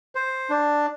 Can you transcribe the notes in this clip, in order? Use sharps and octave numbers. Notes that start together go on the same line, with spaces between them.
C5
D4